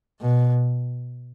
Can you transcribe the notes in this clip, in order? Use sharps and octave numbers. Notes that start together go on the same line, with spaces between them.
B2